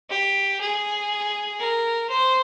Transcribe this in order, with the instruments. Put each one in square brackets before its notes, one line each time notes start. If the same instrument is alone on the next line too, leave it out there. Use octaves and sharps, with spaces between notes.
[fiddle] G4
G#4
A#4
C5